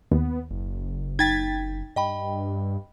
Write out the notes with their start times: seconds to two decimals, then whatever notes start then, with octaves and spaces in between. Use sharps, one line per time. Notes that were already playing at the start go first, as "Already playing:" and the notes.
0.12 D#2 B3
0.51 F#1
1.19 D#4 G5 G#6 A6 B6
1.96 G2 D#5 G5 B5